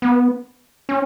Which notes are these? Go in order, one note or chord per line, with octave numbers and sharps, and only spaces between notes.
B3
C#4